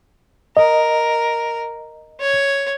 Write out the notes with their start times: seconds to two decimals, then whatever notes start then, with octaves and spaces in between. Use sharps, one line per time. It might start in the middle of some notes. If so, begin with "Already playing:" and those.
0.57 A#4 D#5
2.20 C#5